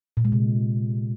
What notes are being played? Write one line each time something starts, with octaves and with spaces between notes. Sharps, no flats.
A#2
G#3
C3